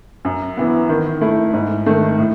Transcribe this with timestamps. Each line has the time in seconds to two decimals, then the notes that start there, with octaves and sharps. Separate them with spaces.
0.25 F#2
0.57 E3 B3
0.89 D#3
1.21 A3 E4
1.53 G#2
1.86 D#3 A3
2.18 A2